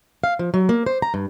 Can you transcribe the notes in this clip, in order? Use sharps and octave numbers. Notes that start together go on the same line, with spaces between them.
F5
F3
F#3
A#3
C5
A#5
G2